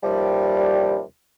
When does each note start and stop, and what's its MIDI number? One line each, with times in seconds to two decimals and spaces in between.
0.03 1.00 39
0.03 1.00 48
0.03 1.00 53
0.03 1.00 55